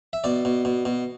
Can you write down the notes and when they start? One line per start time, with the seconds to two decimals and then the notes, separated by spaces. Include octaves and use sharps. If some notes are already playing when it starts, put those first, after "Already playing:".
0.13 E5
0.24 B2 D5
0.45 B2
0.65 B2
0.85 B2